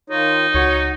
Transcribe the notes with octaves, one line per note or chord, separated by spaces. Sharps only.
D#3 D#4 F4 C#5
C#2 F#4 C#5